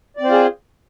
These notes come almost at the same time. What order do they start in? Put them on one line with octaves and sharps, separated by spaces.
D5 C4 C5 F4 G#4